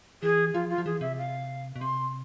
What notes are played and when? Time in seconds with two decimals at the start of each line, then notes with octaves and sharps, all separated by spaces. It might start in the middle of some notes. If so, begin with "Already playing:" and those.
0.23 E3 G#4
0.54 F3 F4
0.70 F4
0.78 F3
0.86 E3 G#4
1.01 C3 E5
1.18 F5
1.76 B2
1.81 C3 C6